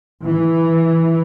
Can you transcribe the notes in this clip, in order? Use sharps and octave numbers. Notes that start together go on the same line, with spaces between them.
E3